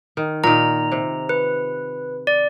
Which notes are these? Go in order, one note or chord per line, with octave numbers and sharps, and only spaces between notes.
D#3
A#2 D#3 A#5
C3
B4
D5